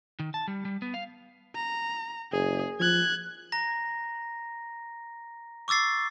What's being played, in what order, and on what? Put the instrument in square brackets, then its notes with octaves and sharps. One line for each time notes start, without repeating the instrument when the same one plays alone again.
[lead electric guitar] D#3
A5
G3
G3
B3
F5
[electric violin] A#5
[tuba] F#1 [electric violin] G#4
[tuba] F3 [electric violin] F#6 G#6
[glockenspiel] A#5 A#6
C#6 D6 E6 A6 C7